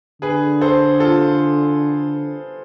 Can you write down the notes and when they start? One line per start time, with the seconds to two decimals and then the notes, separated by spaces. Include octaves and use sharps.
0.22 D3 G#4 B4
0.61 A4 C5
1.00 F4 A4